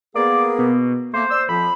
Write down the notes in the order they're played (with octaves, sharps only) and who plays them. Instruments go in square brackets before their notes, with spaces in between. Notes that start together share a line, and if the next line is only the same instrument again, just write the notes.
[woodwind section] A#3 B3 G#4 [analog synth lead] D5
[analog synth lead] B2
[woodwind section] A3 A#3 [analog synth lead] C5
[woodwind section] D5 E6
[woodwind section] F2 F3 [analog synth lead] B5